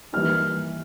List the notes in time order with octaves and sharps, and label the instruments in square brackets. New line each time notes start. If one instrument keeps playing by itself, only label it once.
[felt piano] E3 G3 A#3 D#4 [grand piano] F6